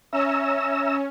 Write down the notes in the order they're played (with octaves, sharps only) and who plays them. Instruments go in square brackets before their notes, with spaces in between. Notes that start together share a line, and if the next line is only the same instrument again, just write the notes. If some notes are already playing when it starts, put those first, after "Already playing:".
[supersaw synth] C#4 [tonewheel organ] E5 A#5 E6